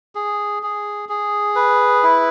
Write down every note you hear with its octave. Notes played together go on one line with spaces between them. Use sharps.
G#4
G#4
G#4
B4
E4